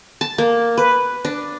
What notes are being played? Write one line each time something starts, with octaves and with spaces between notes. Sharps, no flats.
A5
A#3
B4
D4